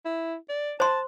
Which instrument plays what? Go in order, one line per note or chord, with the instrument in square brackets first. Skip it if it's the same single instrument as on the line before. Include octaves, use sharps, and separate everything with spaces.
[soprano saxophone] E4
D5
[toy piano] C5 C6 [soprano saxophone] A5